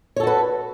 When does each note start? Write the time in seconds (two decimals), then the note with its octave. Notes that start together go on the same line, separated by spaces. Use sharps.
0.16 C#5
0.20 A4
0.23 F#4
0.27 B4